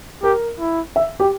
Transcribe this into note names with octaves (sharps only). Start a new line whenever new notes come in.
G4 A#4
E4
E5
G4